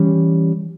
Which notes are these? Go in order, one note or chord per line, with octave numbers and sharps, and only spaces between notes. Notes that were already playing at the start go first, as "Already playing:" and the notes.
Already playing: E3 G3 C#4